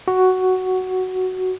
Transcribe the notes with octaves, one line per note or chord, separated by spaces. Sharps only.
F#4